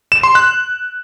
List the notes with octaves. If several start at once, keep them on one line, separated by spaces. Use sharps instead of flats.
E7
C6
F#6